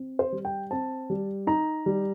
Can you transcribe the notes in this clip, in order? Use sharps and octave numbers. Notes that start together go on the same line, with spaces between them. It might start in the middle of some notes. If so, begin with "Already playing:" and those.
Already playing: C4
C5
G3
G5
C4 A5
G3
D#4 A#5
G3